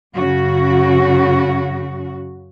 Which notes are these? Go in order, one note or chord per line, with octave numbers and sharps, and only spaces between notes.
F#2 C#3 F#4